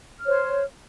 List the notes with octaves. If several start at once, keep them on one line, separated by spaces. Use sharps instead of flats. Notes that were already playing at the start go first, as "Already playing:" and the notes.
C5 C#5 F6